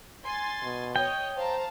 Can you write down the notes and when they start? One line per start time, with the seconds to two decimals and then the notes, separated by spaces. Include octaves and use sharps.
0.24 G#5 C6 A6
0.63 B2
0.96 C#5 D#5 G5
1.36 C5 F5 A5 A#5